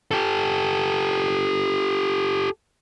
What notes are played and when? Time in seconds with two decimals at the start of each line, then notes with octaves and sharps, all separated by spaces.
0.11 G4 A4